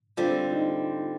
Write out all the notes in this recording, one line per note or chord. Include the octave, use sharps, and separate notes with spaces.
D3 G3 C4 F4
D#4